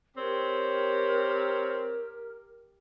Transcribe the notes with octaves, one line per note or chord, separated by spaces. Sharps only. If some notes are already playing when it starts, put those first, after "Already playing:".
C4 G4 A#4 C#5